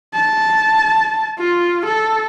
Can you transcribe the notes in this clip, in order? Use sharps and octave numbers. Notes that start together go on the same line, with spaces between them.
A5
F4
A4